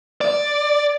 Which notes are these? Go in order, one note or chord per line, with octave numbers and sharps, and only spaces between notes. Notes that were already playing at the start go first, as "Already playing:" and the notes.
D5